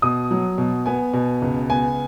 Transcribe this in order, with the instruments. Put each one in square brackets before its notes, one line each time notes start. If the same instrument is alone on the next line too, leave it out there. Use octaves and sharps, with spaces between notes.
[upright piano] B2 D#6
F#3
B2
B3 G#5
B2
C#2
B3 G#5